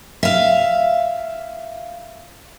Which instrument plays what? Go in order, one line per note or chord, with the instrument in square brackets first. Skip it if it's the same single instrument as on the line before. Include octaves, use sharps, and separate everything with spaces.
[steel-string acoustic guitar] E5 F5